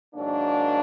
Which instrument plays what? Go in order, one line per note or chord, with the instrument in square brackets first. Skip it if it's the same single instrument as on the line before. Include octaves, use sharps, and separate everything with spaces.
[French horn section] G#2 D#3 F#3 A#3 D4